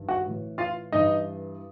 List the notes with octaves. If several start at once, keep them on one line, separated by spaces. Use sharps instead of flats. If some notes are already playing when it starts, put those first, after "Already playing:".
Already playing: G2 D#3
F#4 F#5
A2 E3
F4 F5
G2 E3 D#4 D#5